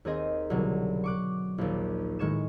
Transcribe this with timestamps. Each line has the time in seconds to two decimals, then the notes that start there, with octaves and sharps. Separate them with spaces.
0.05 D#2 C4 G#4 D#5 G#5 C6
0.50 C2 B2 D3 F#3
1.04 C#6 D6 F#6
1.58 A#1 D#2
2.19 A2 D#3 G#3 C#6 G#6 E7